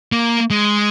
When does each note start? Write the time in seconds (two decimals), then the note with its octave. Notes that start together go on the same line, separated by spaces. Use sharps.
0.12 A#3
0.51 G#3